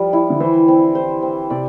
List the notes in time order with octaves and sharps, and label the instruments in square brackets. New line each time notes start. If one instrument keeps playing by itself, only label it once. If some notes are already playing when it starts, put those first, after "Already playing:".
Already playing: [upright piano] F3 [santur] G3
[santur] E4
[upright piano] D3
[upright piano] E3 [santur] C5
[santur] C4
C5
C4
[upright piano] C3 [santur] D5